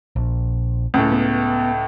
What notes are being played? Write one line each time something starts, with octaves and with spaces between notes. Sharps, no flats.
A#1
C#2 A2
B3